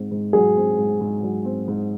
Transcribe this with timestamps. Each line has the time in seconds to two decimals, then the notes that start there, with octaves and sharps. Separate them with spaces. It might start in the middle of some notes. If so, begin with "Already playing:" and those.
Already playing: G#2 C4
0.11 G#2
0.33 F#3 G#4
0.56 C4
0.78 G#2
1.01 G#2
1.23 F#3
1.45 C4
1.68 G#2